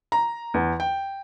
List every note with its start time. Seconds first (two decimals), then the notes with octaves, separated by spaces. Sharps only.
0.12 A#5
0.54 E2
0.80 G5